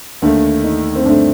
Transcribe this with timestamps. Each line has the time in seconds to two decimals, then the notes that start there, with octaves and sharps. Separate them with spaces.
0.22 D#2 D3 A3 D4
0.64 D#4
0.95 C4
1.05 G2 D3 A3 D4